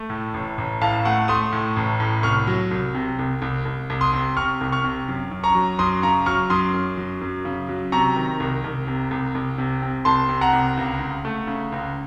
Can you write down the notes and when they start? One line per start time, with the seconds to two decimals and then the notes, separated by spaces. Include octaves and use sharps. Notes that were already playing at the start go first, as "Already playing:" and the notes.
Already playing: A3
0.10 A2
0.34 A1
0.58 A1
0.81 A2 F5 A5
1.05 A3 F#5
1.28 A3 C6 D#6
1.52 A2
1.76 A1
2.00 A2
2.23 C2 C#6 F6
2.47 F#3
2.71 C2
2.95 C3
3.19 C2
3.42 C2
3.65 C2
3.90 C2
4.01 C6 D#6
4.13 C3
4.37 C3 C#6 F6
4.61 C2
4.72 C#6 F6
4.84 C3
5.08 F#2
5.31 F#2
5.44 A#5 C#6
5.55 F#3
5.79 F#2 C6 D#6
6.03 C#3 A#5 C#6
6.26 F#3 C#6 F6
6.50 F#2 C6 D#6
6.74 F#2
6.97 F#3
7.21 F#2
7.45 C#3
7.69 F#3
7.92 C3 A#5 C#6
8.16 D#3
8.40 C2
8.64 C2
8.87 C3
9.11 C2
9.35 C2
9.58 C3
9.82 C3
10.05 C2 A5 C6
10.29 C3
10.41 F#5 A#5
10.53 C2
10.77 C#2
11.00 C#3
11.25 A3
11.47 C#3
11.72 C#2